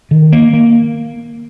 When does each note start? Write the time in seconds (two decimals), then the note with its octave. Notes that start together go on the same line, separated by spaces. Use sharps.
0.11 D#3
0.32 A#3
0.53 A#3